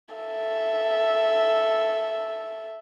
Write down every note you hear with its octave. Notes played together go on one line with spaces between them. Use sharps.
A4 E5